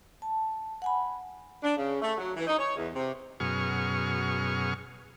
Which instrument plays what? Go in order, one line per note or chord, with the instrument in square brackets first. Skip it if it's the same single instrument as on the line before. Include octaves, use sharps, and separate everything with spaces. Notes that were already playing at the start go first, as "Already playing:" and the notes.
[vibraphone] A5
F#5 G#5 B5
[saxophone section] D4
C#3
A3
F#3
E3
D#4
C#5
E2
C3
[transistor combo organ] F#2 B2 G#4 C#6 F6